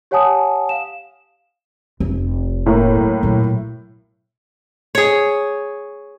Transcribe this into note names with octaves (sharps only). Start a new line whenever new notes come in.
G4 C#5 F#5 G#5 A5 D#6
F5 E7
F1
A2 A#3
F#3
A#2 F#3
G#4 C#5